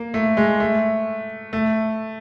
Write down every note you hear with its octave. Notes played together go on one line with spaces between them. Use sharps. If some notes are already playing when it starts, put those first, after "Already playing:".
Already playing: A#3
A3
G#3
A3
A3